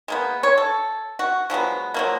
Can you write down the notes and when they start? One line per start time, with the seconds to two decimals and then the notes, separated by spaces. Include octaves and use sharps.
0.08 G#3 A#3 B3
0.43 C#5
0.58 A4
1.19 F#4
1.50 F3 F#3 G#3 B3
1.94 F3 F#3 A#3